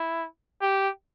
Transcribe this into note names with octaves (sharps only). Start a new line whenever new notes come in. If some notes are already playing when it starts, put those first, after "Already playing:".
Already playing: E4
G4